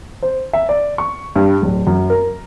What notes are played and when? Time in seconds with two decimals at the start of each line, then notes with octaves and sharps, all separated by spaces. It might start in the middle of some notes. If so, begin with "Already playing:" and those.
0.22 C5
0.53 E5
0.69 D5
0.98 C#6
1.36 G2
1.62 D1
1.87 F#2
2.10 A#4